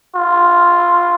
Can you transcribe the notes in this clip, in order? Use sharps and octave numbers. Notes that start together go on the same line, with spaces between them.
F4